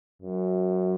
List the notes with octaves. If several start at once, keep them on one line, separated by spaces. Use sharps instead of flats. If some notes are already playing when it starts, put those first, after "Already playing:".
F#2